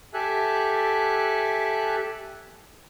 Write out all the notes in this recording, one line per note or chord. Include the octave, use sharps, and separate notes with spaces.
G4 A4 E5 G#5 F#6